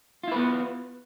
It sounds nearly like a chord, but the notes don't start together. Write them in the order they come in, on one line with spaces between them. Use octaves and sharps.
F4 E4 B4 B3